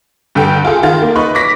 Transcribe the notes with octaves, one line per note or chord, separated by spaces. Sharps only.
G2 D3 A4 G5
F4 G#4 A4
D#3 F4 A6
A#3
D#4 B4 B5 C#6
D6 A#6 B6